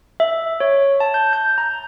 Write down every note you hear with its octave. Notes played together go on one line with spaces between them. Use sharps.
E5
C#5
A5
G6
G6
A#5